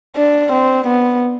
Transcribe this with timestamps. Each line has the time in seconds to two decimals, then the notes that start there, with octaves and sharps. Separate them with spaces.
0.16 D4
0.53 C4
0.87 B3